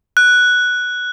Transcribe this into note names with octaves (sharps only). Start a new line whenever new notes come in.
F#6